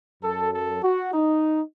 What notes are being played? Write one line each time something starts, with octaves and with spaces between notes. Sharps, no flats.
F#2 F#3 A4
A4
F#4
D#4